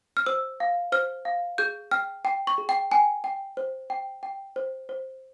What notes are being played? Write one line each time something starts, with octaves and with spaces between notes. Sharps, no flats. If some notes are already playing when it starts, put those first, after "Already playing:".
F6
C5 E6
F5
C5 F6
F5
G#4 G6
G5 F6
G5
C#6
G#4
G5
G5 G#5
G5
C5
G5
G5
C5
C5